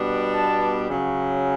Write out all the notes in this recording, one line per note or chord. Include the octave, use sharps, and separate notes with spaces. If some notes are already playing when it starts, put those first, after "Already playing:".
Already playing: B2 G3 B3 D4
A5
C#3 F#3